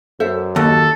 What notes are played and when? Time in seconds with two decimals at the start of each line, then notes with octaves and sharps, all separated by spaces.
0.20 F#2 A4 C5 E5
0.56 D#2 F#4 A4